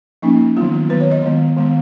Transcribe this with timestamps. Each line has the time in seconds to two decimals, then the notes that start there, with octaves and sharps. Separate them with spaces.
0.22 F3 A#3 C#4 D#4
0.56 D#3 F#3 B3 F4
0.72 F4
0.89 D#3 F#3 B3 B4
1.00 C#5
1.11 D#5
1.22 D#3 G#3 B3
1.56 D#3 G#3 B3